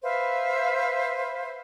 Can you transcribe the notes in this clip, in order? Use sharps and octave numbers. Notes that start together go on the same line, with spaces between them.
B4 C5 E5 F5